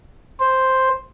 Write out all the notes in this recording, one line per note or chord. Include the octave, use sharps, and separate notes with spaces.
C5